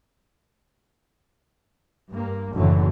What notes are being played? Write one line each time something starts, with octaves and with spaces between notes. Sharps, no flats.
G2 A#3
F#1 A2 D3 E3 F#3